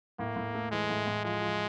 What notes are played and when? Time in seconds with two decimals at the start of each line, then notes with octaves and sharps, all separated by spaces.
0.19 A2 A#3
0.36 A2
0.54 A3
0.71 E3 G#3
0.90 A2
1.06 A2
1.25 F3 G#3
1.42 F3